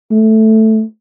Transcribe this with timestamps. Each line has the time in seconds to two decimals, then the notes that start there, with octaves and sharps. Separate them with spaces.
0.11 A3